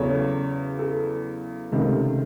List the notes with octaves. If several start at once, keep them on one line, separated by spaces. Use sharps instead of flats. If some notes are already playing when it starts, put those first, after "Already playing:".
Already playing: E2 C#3 F#3 A4 C#5
A4
C#2 C3 D#3 A3